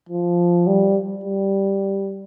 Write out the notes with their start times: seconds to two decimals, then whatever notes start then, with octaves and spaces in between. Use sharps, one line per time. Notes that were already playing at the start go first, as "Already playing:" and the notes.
0.09 F3
0.67 G3
1.24 G3